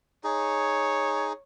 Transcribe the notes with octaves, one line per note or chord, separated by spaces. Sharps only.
D#4 G#4 C#5